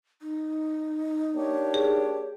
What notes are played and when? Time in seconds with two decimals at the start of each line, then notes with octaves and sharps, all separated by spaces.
0.22 D#4
1.35 A#3 D4 G4 C#5
1.74 G#4